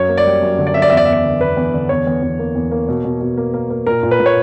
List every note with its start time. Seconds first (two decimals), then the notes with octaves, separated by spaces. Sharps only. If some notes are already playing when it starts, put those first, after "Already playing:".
Already playing: F#2 C#5
0.09 A#3
0.17 D5
0.26 G3
0.42 F#2
0.59 D3
0.67 D5
0.74 F#2 E5
0.82 D5
0.90 E2 E5
0.97 D5
1.05 E2 E5
1.13 D5
1.24 D3
1.40 E2 B4
1.57 E2
1.74 D3
1.89 E2 C#5
2.07 E2
2.22 E2
2.39 A#3
2.55 E2
2.72 A#3
2.88 B2
3.05 B2
3.21 B2
3.37 A#3
3.54 A#3
3.70 A#3
3.87 A#2 A#4
4.03 A#2
4.11 B4
4.20 A#2
4.26 C#5